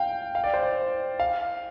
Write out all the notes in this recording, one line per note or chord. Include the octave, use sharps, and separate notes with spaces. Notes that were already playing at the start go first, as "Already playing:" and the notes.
Already playing: F5 G5
F5
D5
C5
D5
F5